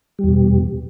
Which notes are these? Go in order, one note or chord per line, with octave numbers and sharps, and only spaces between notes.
E2 B2 G3